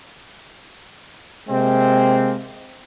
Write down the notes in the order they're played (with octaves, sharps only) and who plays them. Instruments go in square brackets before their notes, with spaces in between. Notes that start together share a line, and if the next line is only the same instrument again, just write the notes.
[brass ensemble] C3 G#3 A#3 C4